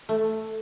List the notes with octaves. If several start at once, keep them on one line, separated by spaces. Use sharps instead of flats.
A3